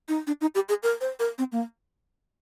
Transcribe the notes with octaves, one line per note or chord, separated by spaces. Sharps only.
D#4
D4
D#4
G4
G#4
A#4
C5
A#4
C4
A#3